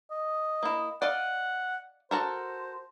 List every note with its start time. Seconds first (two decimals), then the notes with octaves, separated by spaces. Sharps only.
0.11 D#5
0.63 A#3 E4
1.02 D5 D#5 F5 F#5
2.11 F#4 A4 A#4 C5